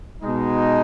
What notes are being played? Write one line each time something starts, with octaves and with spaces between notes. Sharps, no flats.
B2 G#3 D#4